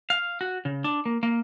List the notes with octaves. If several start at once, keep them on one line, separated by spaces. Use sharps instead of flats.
F5
F#4
C#3
D4
A#3
A#3